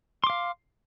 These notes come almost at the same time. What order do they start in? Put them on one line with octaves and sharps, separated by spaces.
C6 D6 F5